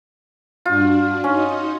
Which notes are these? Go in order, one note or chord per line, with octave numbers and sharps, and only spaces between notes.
G2 D4 F4 F#4
C#4 D#4 F#4 D#5